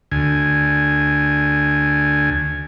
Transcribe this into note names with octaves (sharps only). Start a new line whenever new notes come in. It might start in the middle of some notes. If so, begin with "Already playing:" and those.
D2 G#5